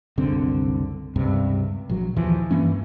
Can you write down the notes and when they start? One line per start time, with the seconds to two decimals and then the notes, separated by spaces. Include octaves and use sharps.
0.18 F#1 C2 D3 C4
1.16 C#2 G2 C3
1.89 A#1 F#3
2.16 D#2 E3 F3
2.51 G2 E3 A#3 C#4